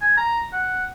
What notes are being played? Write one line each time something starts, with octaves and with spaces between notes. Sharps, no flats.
G#5
A#5
F#5